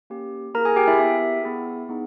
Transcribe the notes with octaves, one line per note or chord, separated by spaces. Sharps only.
A#3 C#4 G4
A#3 E4 G#4 A#4 A#5
G#4 G#5
G4 G5
E4 E5
B3 E4 G4 E5
B3 E4 G#4
B3 D#4 G#4